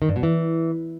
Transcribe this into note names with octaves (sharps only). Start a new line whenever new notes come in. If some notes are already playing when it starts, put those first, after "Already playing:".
D#3
G2
B2
E3